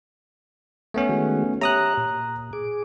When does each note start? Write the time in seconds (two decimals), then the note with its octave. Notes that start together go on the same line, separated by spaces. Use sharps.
0.94 A3 B3 C#4
1.09 D#3 G#3 F#4
1.61 G4 C#5 E5 A#5 D#6 F#6
1.97 A#2
2.53 G#4 D6